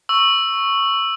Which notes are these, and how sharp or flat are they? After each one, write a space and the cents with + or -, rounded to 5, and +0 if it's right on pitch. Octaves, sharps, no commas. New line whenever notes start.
C#6 +0 E6 +0